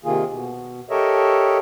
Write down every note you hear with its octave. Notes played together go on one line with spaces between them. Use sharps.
C3 D#3 A#3 F4 G#4
B2
G4 A4 A#4 C#5 D#5 E5